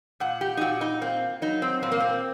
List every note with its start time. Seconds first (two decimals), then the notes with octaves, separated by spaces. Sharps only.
0.20 A#2 F#5
0.41 G4
0.57 D#4
0.61 A#2 F#4
0.81 D#4
1.01 A#3 C4
1.42 F#3 D#4
1.62 C4
1.82 A#2 C4
1.91 A#3
2.00 C4